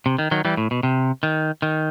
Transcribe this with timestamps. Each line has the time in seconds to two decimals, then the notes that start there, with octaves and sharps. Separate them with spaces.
0.06 C3
0.19 D#3
0.31 D#3 F#3
0.45 E3 G3
0.57 A2
0.71 B2
0.83 C3
1.23 D#3
1.62 D#3